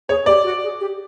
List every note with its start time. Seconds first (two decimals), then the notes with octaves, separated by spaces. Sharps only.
0.09 G#4 C#5
0.26 G4 D5
0.44 F#4
0.63 G#4
0.80 G4